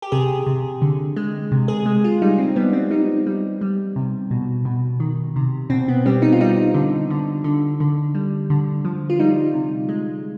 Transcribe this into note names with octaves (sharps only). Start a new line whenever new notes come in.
G4
C3 G#4
C3
D3
G#3
C3
G#4
G#3
F4
G3 D#4
C4
G3 B3
C4
G3 D#4
G3
G3
C3
B2
B2
D#3
C3
B2 C4
B3
G3 C4
D#4
F4
G3 D#4
D3
D3
D3
D3
G3
D3
F3
F4
G3 D#4
C3
G#3